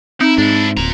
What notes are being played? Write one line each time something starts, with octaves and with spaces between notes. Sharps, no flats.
C4 D#4 E4
G#2 D4 E4
D1 F4 A#5